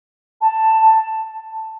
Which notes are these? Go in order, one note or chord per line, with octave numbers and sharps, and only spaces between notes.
A5